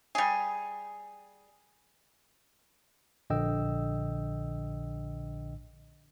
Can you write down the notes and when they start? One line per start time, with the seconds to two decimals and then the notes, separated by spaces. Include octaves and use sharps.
0.15 G3 G#4
3.30 A#1 D3 D#5 G5 E6